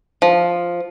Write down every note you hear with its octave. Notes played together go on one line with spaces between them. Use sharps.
F3